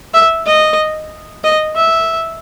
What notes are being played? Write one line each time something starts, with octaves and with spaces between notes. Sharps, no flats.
E5
D#5
D#5
E5